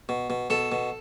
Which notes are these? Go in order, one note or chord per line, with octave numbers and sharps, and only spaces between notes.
B2
B2
B2 A4
B2